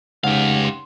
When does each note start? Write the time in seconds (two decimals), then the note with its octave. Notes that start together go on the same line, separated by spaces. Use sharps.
0.24 C#2 D#4 G4 C#5 F5 F#5
0.65 C6